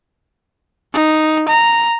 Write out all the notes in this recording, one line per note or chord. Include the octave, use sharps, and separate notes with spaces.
D#4
A#5